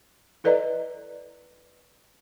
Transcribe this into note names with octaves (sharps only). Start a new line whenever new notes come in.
E4 A4 B4 D5 D#5 A#5